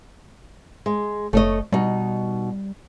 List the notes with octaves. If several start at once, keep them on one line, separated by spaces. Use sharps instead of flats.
G#3
F#1 A3 C#5 D#5
B2 G3 D#4